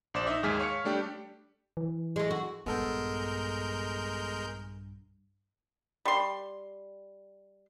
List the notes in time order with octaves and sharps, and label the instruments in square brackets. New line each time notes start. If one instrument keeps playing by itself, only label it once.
[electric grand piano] A#1 C5 D5 E7
D#4 D#5 E5
D#2 G#2 G#3 G#4 F6 B6
C#5 F5 F6 C#7
G3 A3 D4 G4
[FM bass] E3
[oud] G#3 A3
F#4
[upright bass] A#1 G2 [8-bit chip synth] G#3 A#4 G6 [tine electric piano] B3 A4
[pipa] G3 C6